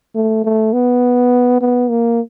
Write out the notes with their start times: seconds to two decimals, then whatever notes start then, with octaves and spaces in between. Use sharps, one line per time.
0.15 A3
0.44 A3
0.73 B3
1.61 B3
1.90 A#3